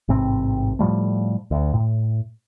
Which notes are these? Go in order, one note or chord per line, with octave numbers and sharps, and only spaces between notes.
A1 G#2 C3 C4
A2 F3 G3 A3
D2
A2